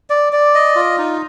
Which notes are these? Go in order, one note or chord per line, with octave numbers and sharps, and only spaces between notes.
D5
D5
D#5
F4
D#4